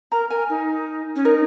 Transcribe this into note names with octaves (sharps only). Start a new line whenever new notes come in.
A#4 A#5
A#4 G#5
D#4
C#4
D#4 A#4